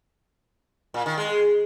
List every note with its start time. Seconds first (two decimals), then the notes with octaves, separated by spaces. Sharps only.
0.94 A#2
1.06 D#3
1.18 G#3